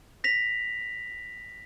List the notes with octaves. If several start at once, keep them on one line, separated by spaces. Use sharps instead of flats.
A#6 B6 F7